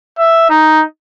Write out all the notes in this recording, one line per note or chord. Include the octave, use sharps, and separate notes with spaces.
E5
D#4